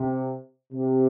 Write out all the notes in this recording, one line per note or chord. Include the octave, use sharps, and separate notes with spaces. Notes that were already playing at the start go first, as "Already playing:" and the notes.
Already playing: C3
C3